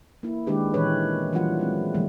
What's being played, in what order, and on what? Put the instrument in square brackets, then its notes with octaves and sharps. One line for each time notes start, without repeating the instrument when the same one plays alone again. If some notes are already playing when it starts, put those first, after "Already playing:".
[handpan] A#3 E4
D#3 G#3 D4 G4 B4
A#2 D#3 E3 C#4 B4 C#5
E3 F#3 G3 F4 F#5
F#3 G#3 C4
B2 D#3 F3 G3 A3 B3